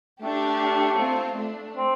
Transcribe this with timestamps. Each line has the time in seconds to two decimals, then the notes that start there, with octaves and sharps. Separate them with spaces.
0.22 A3 D4 G4
0.99 C4 F4
1.37 A3 D4
1.77 C4